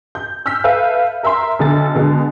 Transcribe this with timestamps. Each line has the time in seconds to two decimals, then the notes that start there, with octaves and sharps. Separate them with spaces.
0.15 G6
0.46 E6 F6 G6 B6
0.64 A4 B4 E5 F5
1.23 A#4 E5 A#5 C6
1.59 B1 D3 A4 A6
1.95 B2 D3 G#3